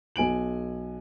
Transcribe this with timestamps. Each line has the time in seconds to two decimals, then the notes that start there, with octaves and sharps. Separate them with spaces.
0.16 B1 G#5 D7 F#7